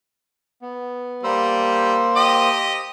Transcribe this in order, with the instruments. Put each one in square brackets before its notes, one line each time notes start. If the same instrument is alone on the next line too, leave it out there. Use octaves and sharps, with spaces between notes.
[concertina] B3
[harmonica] G3 [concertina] A#3 C5 E6
[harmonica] G4 D#5 D#6